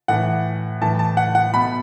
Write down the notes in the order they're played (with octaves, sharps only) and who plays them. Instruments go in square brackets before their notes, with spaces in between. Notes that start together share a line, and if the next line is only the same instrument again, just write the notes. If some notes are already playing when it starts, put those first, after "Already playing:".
[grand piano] A2 E3 F#5
A2 E3 A5
A5
F#5
F#5
B2 B5